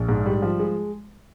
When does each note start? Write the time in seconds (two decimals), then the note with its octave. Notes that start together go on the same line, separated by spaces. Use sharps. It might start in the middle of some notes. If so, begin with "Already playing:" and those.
Already playing: A#1
0.09 G#2
0.26 G3
0.42 F3
0.60 G#3